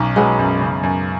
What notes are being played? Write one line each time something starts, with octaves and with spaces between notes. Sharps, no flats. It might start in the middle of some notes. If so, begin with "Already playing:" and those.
Already playing: B1 C#4 D#4
F#3 G#3 B3
F#2
C#3
F#2